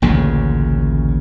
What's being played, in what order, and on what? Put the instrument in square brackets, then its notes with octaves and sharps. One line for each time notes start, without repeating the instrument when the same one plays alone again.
[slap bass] A1 D2 A#2 C#3